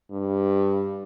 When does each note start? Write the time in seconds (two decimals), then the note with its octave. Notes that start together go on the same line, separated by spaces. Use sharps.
0.11 G2